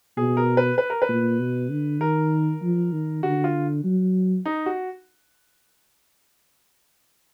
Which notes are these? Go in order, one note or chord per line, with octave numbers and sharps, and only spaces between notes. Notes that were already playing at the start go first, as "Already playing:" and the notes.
B2 G#4
A#4
B4
B4
A#4
B4
A#2
B2
D3
D#3 A#4
F3
D#3
D3 F#4
F4
F#3
D#4
F#4